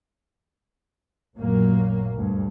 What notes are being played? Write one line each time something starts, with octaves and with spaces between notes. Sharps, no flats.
A1 F#2 A#2 F#3 A#3
D2 G2